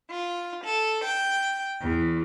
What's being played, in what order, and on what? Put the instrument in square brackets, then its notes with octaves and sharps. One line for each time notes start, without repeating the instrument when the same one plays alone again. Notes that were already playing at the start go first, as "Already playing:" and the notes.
[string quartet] F4
A4
G5
E2